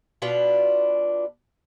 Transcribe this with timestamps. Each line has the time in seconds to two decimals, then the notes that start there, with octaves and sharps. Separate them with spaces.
0.22 B2 D4 F4 B4